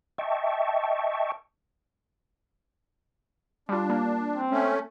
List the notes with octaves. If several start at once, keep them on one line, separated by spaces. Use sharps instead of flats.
D#5 E5 G5 A5 C#6
G3 D4 F4
A#3
C4
A3 C#4